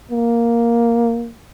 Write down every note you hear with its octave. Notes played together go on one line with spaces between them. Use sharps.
A#3